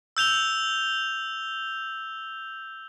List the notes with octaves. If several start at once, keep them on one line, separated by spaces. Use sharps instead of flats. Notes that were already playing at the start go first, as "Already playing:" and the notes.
E6 G6 F7 G7